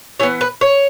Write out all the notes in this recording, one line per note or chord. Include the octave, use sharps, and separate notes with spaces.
E3 B3 C#5
B4
C#5